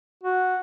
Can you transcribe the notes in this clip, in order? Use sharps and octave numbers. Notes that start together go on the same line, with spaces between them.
F#4